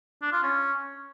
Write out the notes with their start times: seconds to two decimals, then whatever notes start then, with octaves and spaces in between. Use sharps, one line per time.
0.22 D4
0.32 F4
0.43 C#4